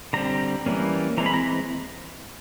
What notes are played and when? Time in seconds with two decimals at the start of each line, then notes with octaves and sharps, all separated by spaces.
0.13 D3 G3 C4 A#5
0.66 E3 G3 A#3 C#4
1.17 E3 G#3 C4 A#5
1.26 B5
1.34 A#5